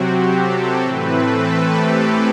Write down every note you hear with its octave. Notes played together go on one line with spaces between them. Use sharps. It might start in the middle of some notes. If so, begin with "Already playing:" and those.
Already playing: C3 F#3 C4 F#4 G4
A4
A2 E3 A3 C4 B4
A4
G4